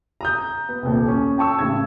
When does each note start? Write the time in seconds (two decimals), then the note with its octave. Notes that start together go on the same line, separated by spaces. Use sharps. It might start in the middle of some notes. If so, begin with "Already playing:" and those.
0.21 A#5 D#6 G6
0.69 B3
0.83 D#1 C2
1.08 C#4
1.38 G5 A5 C#6 E6
1.59 A1 C#3 G#6